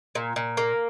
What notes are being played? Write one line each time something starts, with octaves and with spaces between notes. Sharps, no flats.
A#2
A#2
A#3